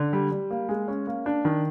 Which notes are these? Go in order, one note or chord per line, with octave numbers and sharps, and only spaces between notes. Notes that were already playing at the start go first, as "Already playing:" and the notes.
Already playing: D3
G3
G3
A#3
G#3
C#4
A#3
D4
D#3